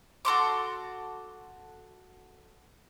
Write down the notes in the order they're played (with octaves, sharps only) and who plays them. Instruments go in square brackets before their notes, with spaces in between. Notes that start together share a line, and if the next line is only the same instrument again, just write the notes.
[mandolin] F#4 A4 C6 D6